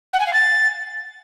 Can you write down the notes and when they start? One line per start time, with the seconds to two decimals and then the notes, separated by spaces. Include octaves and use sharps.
0.13 F#5
0.20 G#5
0.27 F5
0.33 A6